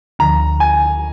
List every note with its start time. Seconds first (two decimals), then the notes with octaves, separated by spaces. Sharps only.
0.19 D2 D3 F3 A#5
0.60 G#5